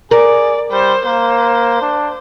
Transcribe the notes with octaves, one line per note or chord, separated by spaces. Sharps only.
G#4 A#4 D5
G3 C5
A#3 C5
D4